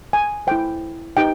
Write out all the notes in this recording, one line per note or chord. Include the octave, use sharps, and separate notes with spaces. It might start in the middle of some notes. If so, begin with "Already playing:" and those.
G#5
E4 A4 C5 G5
D#4 G4 B4 G5